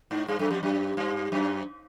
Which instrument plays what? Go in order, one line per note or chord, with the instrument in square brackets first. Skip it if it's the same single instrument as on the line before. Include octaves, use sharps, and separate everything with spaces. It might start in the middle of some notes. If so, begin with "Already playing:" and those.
[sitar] G#2 [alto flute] D#4
[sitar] G2 [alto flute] G#4
[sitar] F#2 [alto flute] A4
[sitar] F2 [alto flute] G4
[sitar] F#2 [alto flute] G4
[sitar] G2
F#2